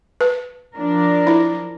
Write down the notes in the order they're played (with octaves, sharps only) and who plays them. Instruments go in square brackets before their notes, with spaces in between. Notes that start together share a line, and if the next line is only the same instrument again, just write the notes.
[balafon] B4
[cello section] F3 D4 A#4
[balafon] E4